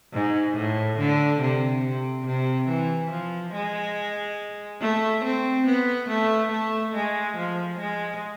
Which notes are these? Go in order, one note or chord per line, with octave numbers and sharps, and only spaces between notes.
G#2
A2
D3
C3
C3
C3
E3
F3
G#3
A3
C4
B3
A3
A3
G#3
F3
G#3